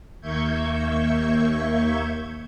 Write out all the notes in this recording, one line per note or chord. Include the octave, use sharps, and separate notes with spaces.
D#2 A#3 E5 C#6 G6 G#6